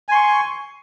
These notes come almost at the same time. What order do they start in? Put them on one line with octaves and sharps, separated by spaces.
G#5 C6 C#6